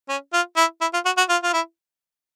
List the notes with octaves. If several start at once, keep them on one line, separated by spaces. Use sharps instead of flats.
C#4
F4
E4
E4
F4
F#4
F#4
F4
F4
E4